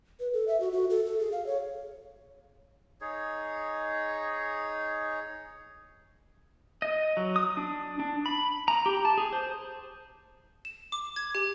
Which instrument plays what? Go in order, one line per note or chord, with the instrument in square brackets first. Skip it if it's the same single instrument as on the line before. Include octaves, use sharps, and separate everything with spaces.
[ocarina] B4
A4
E5
F#4
F#4
A4
A4
G#4
F5
C#5
[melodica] D#4 G#4 C#5
[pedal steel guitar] D#5
F#3
D#6
D4
D4
B5
A#5
G4
A5
G#4
C5
[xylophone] E7
D6
G#6
G4